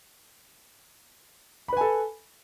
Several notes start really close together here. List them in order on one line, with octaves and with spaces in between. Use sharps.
B5 B4 G#5 A4